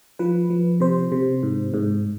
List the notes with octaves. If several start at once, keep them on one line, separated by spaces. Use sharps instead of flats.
F3 B4
F3
C3 C5
C3
G#2
G#2